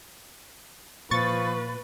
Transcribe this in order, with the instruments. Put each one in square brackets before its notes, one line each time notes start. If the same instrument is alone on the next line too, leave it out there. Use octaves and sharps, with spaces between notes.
[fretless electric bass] A#2 [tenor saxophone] F3 [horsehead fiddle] B4 [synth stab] C#6 A6